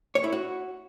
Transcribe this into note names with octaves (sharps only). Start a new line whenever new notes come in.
C#5
E4
F#4